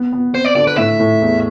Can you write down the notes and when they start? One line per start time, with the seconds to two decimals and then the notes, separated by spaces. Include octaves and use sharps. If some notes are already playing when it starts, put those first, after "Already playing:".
Already playing: B3
0.13 B3
0.33 C4 C5
0.45 D5
0.55 D3 D5
0.67 B4
0.77 A2 E5
1.00 A2
1.22 E2